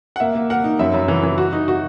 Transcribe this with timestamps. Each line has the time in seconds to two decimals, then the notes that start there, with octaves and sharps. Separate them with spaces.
0.16 F#5
0.20 A#3 E5
0.35 A#3
0.50 A#4 F#5
0.64 D#4
0.79 F#2 E5
0.94 F#2
1.08 E3
1.23 E3
1.38 F#4
1.53 D#4
1.68 F#4